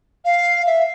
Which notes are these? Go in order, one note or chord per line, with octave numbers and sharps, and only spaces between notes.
F5
E5